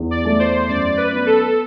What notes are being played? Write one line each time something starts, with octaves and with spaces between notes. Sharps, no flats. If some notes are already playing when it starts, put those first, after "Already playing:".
Already playing: E2
D5
A3
C5
F#2 D5
B4
B3
A4